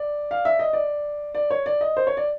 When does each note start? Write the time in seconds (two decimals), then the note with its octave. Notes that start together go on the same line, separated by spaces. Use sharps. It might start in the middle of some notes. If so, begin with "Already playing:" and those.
Already playing: D5
0.31 F5
0.45 E5
0.59 D#5
0.73 D5
1.35 D5
1.50 C#5
1.66 D5
1.81 D#5
1.97 C5
2.07 C#5
2.17 D5